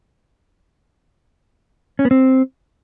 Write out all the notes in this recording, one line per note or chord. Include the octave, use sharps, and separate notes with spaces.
C#4
B3
C4